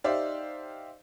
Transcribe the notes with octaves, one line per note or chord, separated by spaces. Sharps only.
D#4 G4 C5 D5 E5 F5